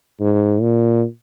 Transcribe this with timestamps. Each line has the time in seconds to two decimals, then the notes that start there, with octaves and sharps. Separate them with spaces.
0.20 G#2
0.61 A#2